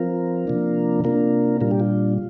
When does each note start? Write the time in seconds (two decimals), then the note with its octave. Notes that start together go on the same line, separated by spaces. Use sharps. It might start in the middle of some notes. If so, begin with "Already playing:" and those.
Already playing: F3 C4 F4 A#4
0.47 C3 F3 A#3 D4
1.04 C3 A#3 D4 F4 A#4
1.61 A#2 G3 D4 F4 A#4
1.71 G4
1.80 F4